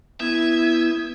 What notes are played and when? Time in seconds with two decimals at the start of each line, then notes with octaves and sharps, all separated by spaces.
0.20 B3 E4 E5 D#6 G#6